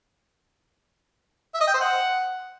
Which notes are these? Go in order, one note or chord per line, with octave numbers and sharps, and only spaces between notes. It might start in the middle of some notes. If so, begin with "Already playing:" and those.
E5
D#5
G5
C5
F#5